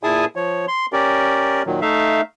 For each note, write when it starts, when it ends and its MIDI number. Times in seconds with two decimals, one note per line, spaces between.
0.03 0.25 46
0.03 0.25 64
0.03 0.25 68
0.03 0.25 80
0.03 0.25 81
0.03 0.25 87
0.36 0.66 53
0.36 0.66 73
0.68 0.86 84
0.93 1.62 61
0.93 1.62 67
0.93 1.62 70
0.93 1.62 74
1.66 1.80 46
1.66 1.80 51
1.66 1.80 54
1.82 2.21 57
1.82 2.21 63
1.82 2.21 76
1.82 2.21 77